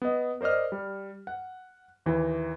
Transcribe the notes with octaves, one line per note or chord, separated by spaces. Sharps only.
B3 D#5
A#4 C5 D5 D#5 F6
G3
F#5
D#2 E3